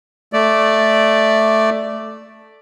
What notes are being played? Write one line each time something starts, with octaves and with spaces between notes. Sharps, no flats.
A3 D5